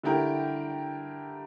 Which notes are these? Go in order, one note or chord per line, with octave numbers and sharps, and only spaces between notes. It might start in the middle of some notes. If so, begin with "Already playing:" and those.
D3 A3 E4 G4 A#4